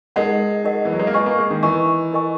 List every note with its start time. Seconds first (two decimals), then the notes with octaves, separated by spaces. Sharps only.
0.16 G#3 D#4 A#4 D#5 F#5
0.65 D#4 A#4 D#5 F#5
0.85 E3
0.92 F#3
0.99 G#3
1.07 A#3
1.13 B3 E4 A#4 D#5 G#5 C#6
1.26 A#3
1.38 G#3
1.50 D#3
1.63 E3 E4 A#4 D#5 G#5 C#6
2.12 E4 A#4 D#5 G#5 C#6